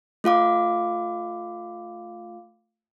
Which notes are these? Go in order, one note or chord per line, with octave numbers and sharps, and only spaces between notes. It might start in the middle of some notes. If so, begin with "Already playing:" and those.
A3 F4 F5 D6